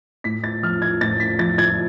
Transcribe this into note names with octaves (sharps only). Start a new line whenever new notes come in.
A2 B6
A6
F3 F6
G#6
A2 A6
B6
F3 A6
G#6